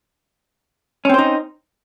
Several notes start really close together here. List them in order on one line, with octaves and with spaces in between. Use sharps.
C#4 C4 C5 D#4